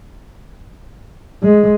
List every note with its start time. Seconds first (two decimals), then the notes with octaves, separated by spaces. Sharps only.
1.43 G#3